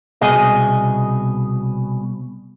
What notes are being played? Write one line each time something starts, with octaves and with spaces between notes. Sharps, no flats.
C2 B2 G#4 D#5